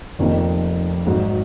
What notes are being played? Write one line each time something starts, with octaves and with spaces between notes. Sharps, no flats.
F1 F2 D#3 A#3 D#4
G#1 G#2 F#3